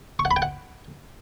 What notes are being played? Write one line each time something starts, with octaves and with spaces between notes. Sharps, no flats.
C#6
F#5
B5
G5
F#5